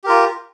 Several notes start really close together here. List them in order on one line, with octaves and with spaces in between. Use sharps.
G4 A#4 F4